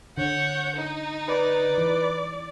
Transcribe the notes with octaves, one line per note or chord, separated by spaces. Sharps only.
D3 C#5 F#5 G6
D#4
B4 D5
E3